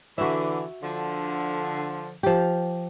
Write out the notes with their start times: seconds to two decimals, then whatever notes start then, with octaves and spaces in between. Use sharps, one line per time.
0.18 D3 E3 F#4 E5
0.82 D3 F3
2.23 F3 G4